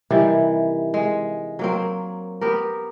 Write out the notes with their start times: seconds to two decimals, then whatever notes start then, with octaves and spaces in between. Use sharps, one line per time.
0.10 C3 D#3 E3 G3
0.94 G#3
1.59 F#3 A#3 C4
2.41 B3 G4 A#4